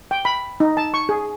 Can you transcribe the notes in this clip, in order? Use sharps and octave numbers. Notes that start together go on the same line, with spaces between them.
G5
B5
D#4
A5
C#6
G#4